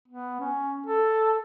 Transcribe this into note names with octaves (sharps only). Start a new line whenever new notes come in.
B3
C#4
A4